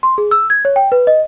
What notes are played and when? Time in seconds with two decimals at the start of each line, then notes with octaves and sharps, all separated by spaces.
0.03 C6
0.18 G#4
0.31 E6
0.50 G#6
0.65 C#5
0.76 G5
0.92 B4
1.07 D#5